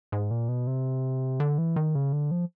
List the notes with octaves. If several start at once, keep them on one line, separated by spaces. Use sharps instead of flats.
G#2
A#2
B2
C3
D3
E3
D#3
C#3
D3
F3